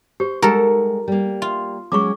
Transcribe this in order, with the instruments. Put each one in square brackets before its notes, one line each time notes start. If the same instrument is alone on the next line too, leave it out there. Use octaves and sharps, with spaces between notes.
[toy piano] G4 [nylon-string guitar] C5
[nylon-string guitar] G3 G#3 F#5 [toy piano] D#4 G4 A#5 [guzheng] A4 A#4
[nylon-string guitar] G3 A#3
[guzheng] F4
[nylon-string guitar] F#3 G#3 C#4 [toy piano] C#6 D6